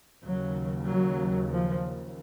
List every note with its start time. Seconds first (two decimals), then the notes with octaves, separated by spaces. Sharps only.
0.23 D#2 C#3 F#3
0.88 F#3
1.52 F3